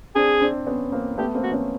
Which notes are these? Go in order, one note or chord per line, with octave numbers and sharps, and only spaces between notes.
C4 D4 G#4
C4 D4
B3 C#4
A#3 C4
A3 B3 G4
A#3 C4
F#4
B3 C#4